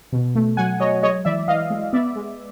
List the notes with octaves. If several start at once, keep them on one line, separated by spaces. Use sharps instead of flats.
B2
A3
F#3 F#5 G#5
F#3 C#5 D#5
G#3 C#5 D#5
E3 D5 E5
E3 D#5 F5
G#3
B3 D5 E5
G#3